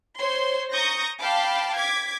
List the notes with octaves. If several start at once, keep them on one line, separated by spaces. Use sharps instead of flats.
C5 C#5 C6
A#5 C#6 D#6 G6 A#6
F5 G5 A5 B5 D6
D6 G#6 B6